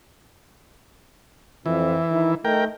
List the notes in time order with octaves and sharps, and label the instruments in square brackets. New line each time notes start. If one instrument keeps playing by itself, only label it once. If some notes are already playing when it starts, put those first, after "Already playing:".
[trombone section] F2 [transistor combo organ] E3
[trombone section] D#3 D#4 E4
[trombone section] A3 D#4 [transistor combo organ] A#4 G5